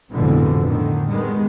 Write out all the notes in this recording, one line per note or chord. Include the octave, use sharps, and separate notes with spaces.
A1 F2 G#2 B2 D3 E3
A2 D3 D#3
D#3 G3 G#3 B3